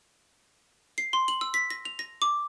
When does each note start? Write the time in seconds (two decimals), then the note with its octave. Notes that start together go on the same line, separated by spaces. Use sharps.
0.98 C7
1.13 C6
1.28 F#7
1.41 E6
1.54 B6
1.70 A#6
1.85 F7
1.99 A#6
2.22 D6